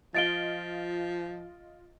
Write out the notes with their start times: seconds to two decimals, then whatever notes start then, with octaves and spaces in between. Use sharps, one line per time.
0.14 F3 F4 D#5 A6 D7 G7